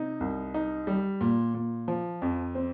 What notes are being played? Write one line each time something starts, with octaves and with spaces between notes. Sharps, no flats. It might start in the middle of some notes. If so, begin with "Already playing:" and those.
Already playing: C3 D#4
C2
D#4
G3
A#2
A#2
F3
F2
C4